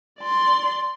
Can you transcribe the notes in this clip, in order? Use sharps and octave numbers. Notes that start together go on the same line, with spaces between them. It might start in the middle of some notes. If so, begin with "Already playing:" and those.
D5 C6